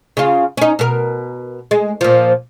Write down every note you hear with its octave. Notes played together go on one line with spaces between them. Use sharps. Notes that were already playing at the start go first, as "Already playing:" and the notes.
C#3 F4
C#4 D#4
B2 A#4
G#3
A#2 F3